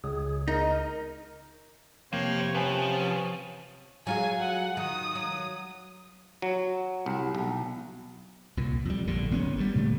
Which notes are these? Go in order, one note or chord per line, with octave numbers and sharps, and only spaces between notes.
C#2 G#4
D#4 A#4 D#5
F2 C3 A#3 C5 C#5 F5 G5
F3 C#4 B4 G5 G#5
F#3 F4 G#4 G#5
F#5
D#3 D#6
F#3
F#3
C2
B1
C2 A#2
F2 G3
A#1 A#2 D3
G1 B3 C#4
G2 G3
A#2 D3 A3